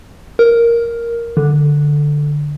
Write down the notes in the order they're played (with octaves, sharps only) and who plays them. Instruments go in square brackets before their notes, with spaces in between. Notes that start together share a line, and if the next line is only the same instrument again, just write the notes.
[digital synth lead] A#4
D3